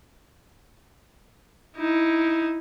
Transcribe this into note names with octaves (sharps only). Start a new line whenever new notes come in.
D#4 E4